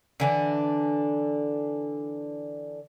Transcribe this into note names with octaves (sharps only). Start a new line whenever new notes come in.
D3 E3 D4